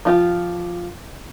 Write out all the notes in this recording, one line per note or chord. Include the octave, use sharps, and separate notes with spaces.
F3 F4 G4